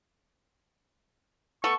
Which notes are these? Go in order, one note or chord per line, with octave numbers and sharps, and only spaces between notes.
A3 B3 A4 C#6